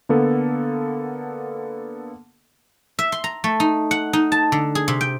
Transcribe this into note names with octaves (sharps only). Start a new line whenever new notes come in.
D3 A#3 B3 A4
E5
C6
A#5
A3
D#4
F#5
D#4
A5
D3
G#4
C3
G5